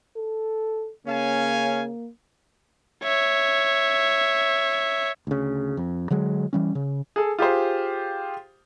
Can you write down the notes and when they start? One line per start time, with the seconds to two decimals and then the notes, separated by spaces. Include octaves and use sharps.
0.17 A4
1.07 C#3 A#3 C#4 F5 G#5
3.03 C#5 E5
5.27 D2 C#3
5.77 F2
6.10 D3 F#3 G#3
6.53 E3 G3 C#4
6.75 C#3
7.16 G#4 A4
7.39 F4 G4 G#4 C5